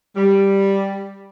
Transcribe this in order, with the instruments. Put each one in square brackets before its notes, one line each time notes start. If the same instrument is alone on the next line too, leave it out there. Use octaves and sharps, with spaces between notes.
[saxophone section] G3